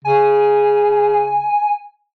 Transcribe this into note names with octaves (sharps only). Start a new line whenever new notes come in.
C#3 G#5